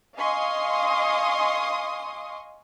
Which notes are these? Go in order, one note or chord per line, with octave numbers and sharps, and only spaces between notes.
D#5 F5 G#5 C6 C#6 D#6